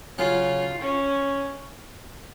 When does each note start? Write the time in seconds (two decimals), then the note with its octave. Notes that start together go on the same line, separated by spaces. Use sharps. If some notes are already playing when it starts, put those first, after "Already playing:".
0.18 C#3 F#3 C#4 F4
0.81 C#4